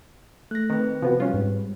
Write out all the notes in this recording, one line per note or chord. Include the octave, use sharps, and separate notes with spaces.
A3 F#6 A#6
D#3 C4 B4
C3 F3 B3 F#4
G3 C#4 F4
G#2